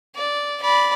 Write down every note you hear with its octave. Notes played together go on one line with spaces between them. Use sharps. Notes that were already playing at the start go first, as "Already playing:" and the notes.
D5
D5 B5